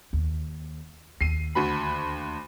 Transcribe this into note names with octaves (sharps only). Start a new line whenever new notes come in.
D#2
D#2 C7 D#7
D2 F#4 B5